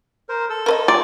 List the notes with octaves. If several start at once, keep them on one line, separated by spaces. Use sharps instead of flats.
A#4 C5
A4 E6
A#4 B4 D#5
F4 G4 D5